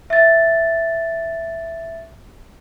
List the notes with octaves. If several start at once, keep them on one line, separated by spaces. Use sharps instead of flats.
E5 A6